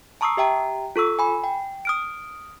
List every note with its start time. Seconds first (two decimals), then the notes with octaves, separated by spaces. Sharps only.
0.21 A5 A#5 C#6 D#6 E6 C7
0.37 G4 E5 G5 A#5
0.96 F4 A4 C#6 E6
1.19 G#5 B5
1.44 G5
1.85 D#6 F6 D7